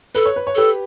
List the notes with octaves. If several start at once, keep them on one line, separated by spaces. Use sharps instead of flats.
A4 B4
C#5
B4
C#5
G4 A4 B4